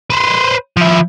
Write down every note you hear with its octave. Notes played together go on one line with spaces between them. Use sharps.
B4 C5
F3 E4